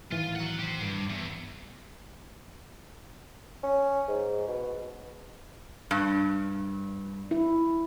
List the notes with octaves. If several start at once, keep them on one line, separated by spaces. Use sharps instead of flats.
A2 D#3 E3 F4
F#3 F#5
G4 C5
G2
E2
C#4
G#2
B2
G2
E4